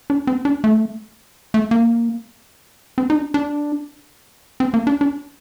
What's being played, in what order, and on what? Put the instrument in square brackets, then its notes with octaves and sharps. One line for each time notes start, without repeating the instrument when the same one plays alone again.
[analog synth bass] D4
C4
D4
A3
A3
A#3
C4
D#4
D4
D4
C4
A#3
D4
D4